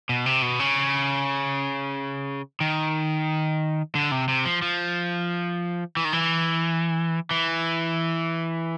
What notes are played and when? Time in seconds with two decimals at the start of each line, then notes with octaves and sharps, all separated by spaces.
0.09 B2
0.26 C3
0.42 B2
0.60 C#3
2.60 D#3
3.95 D3
4.11 C3
4.28 C3
4.45 F3
4.62 F3
5.97 E3
6.05 D#3
6.13 E3
7.31 E3